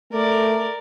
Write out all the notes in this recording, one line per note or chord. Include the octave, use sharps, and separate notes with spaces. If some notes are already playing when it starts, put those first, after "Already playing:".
A3 A#4 D5